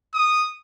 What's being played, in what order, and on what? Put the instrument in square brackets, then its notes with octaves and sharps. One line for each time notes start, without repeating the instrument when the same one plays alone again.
[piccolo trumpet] D#6